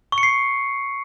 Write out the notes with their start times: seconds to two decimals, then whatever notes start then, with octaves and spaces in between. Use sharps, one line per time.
0.12 C#6
0.18 C#7
0.23 C7